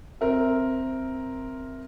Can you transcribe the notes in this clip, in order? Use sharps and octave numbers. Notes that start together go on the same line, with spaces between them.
C4 A#4 E5